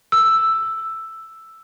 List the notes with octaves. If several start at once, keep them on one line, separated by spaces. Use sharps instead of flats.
E6